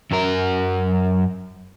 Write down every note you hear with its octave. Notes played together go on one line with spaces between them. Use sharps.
F#2 A#4